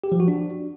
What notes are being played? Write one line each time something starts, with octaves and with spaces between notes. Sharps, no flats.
G4
F3
F#4
D4